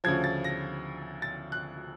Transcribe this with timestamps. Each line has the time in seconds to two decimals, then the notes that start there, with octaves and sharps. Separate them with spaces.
0.04 D2 C#3 F3 G#6
0.24 A6
0.44 A#6
1.22 A6
1.52 F#6